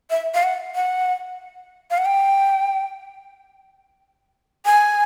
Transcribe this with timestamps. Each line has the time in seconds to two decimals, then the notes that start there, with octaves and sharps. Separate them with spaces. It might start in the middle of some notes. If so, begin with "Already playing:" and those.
0.10 E5
0.34 F5
0.43 F#5
0.75 F#5
1.91 F5
1.98 F#5
2.05 G5
4.66 G#5